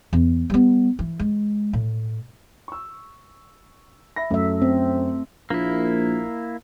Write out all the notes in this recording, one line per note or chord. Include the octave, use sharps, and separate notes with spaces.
E2
G3 B3
E3
G#3
A2
C#6 E6
E5 B5 A#6
F#2 A3 E5
C4
A#1 A#3 E4